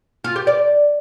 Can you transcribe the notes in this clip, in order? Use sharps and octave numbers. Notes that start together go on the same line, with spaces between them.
F4
G4
D5